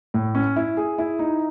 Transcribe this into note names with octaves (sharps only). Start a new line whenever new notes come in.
A2
C#4
E4
G#4
E4
D#4